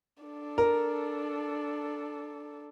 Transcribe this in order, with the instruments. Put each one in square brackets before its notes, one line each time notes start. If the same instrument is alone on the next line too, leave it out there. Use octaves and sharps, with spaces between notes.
[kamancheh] D4 A4
[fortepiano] A#4